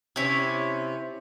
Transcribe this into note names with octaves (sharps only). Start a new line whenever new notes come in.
C3 C#4 E4 C#5